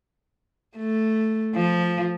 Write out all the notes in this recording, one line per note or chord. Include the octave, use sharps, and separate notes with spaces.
A3
F3